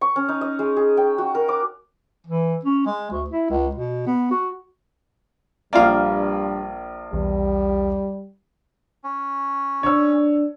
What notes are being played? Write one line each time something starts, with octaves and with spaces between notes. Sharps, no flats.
C#6
C#4
D#4
D#5
G#3
G#4
G5
F#4
A#4
D6
E3
C#4
G#3
D2
E4
C#2
B2
B3
F#4
A#1 G2 A#3 F4 D5 F5
B1 E2 G3
C#4
D4 C#5 E6